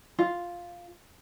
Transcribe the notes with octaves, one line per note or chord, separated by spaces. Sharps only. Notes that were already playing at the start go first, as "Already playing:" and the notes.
F4